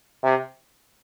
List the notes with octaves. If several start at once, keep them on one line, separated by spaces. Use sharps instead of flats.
C3